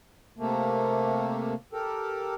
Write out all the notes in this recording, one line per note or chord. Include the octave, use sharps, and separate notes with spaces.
C3 A3 A#3
G4 A4 A#4